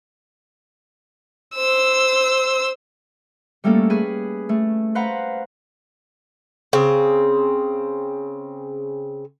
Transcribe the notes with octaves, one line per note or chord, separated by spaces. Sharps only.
C5 E6
G3 A3 A#3 C#4 A4
G#4 B4
A3
B4 C5 F5 F#5 A#5 B5
C#3 C4